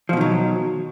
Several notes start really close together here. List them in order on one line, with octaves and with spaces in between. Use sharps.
F3 B2 D#3 F#3